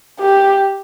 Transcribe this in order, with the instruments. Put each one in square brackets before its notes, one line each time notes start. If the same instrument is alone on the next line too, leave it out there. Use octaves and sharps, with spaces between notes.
[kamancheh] G4